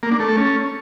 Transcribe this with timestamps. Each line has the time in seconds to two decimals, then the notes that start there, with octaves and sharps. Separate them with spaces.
0.03 A#3
0.11 D4
0.20 A3
0.28 A4
0.37 C#4